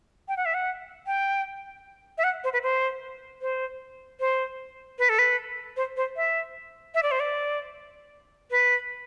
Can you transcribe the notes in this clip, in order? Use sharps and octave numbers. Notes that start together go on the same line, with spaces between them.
G5
F#5
E5
F#5
G5
E5
F#5
C5
B4
C5
C5
C5
B4
A4
B4
C5
C5
E5
E5
D5
C5
D5
B4